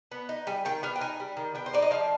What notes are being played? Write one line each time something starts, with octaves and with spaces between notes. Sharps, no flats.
B3
D#4
G3 G#5
D#3 G5
B3 F5
G5
D#4 G#5
G3
D#3
B3 G5
C5
D#4 D5
D#5
F3 F5